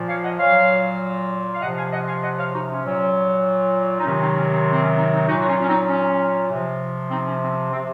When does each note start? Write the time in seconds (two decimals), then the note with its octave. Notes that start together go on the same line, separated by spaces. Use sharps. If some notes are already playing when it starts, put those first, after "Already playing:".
Already playing: A#2 F3
0.08 C#5 F5
0.24 D#5 F#5
0.39 A#2 F#3 C#5 F5
1.54 F5
1.62 C3 F3 D#5 F#5
1.76 F5 G#5
1.92 D#5 F#5
2.07 F5 G#5
2.22 D#5 F#5
2.38 C#5 F5
2.53 D#4 F#4
2.68 C#4
2.84 A#2 F#3
3.99 D#4
4.05 C3 D#3 F#3 C#4
4.21 C4 D#4
4.36 C#4
4.51 C4
4.71 C4
4.81 C#4
4.97 C4 D#4
5.13 C4 D#4
5.27 A#2 F#3 D#4 F#4
5.41 F#4
5.48 C#4 F4
5.61 C#4
5.68 C4 D#4
5.89 C#4
6.49 C3 F3
7.11 C4 D#4
7.26 C#4
7.42 C4
7.71 C3 F3 C4